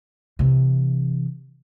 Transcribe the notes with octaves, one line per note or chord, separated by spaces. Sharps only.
C3 E3